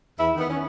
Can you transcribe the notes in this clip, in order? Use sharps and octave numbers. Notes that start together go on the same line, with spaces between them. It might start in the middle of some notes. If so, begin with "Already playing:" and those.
E2 E4
D#3 B3
C#4